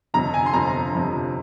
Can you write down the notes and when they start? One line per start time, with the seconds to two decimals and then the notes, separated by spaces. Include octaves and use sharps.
0.14 G1 F2 C3 F3 A#5
0.34 G#5
0.46 C6
0.54 G1 F2 C3 F3 A#5
0.67 A#5
0.94 G1 F2 C3 F3